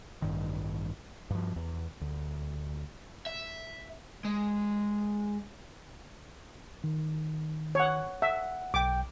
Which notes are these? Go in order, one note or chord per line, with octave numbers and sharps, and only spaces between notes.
A1 G2 D#3
G2 F3
E2
D2
E5
G#3
D#3
C#5 F#5
E5 F#5
B1 G5 D6